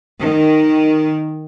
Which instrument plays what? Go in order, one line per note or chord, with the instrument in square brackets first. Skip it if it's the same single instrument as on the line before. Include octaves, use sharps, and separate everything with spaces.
[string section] D#3